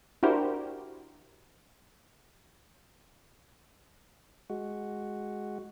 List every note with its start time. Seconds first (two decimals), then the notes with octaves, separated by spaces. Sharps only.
0.23 D4 E4 F#4 G4 A#4 C5
4.50 G#3 F#4